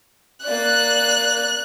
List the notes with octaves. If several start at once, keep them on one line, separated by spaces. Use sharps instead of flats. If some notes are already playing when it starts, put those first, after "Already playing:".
A#3 D5 F#6